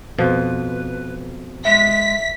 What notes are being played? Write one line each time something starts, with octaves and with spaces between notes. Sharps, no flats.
F2 B2 F3 B4
G#3 E5 B6